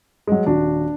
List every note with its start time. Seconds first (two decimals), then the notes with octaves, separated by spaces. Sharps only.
0.27 F#3 G#3
0.46 D#1 D4 F#4